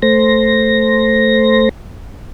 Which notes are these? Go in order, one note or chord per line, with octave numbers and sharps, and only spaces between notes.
A3 C5 A#6